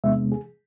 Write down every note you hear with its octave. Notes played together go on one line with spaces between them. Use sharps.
E2 C3 G#3 B3 D4 E5
G#4